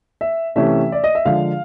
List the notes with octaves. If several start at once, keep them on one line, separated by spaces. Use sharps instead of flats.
E5
C3 E3 A3 C#4 E5
D5
D#5
E5
D3 F3 G#3 F5